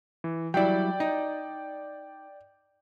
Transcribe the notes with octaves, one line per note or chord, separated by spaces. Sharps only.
E3
F#3 G3 E4 D5 G5
D#4